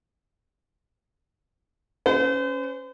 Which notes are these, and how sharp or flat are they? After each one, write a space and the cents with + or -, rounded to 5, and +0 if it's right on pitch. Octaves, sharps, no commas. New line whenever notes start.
C#4 +0 C5 -45